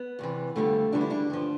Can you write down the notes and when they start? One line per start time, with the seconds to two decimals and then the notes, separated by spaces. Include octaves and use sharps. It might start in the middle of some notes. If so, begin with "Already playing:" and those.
Already playing: B3
0.19 E2 C3 E3
0.56 F2 D3 G3 A3
0.92 E2 D3 G3 D4
1.01 E4
1.10 D3 D4
1.30 G2 F3